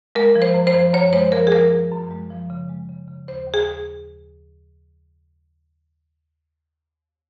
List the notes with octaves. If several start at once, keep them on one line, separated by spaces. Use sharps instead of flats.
G#3 A#4
F3
C5
F#2
C5
F3
F#2 C#5
G#3 C5
F3 A#4
G#4
F3 A#4
F#2
F#2
G#3
F3
C#3
G#3
C#3
C#3
D#2 C5
D#2
G#4